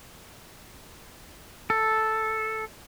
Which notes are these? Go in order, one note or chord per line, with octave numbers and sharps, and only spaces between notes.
A4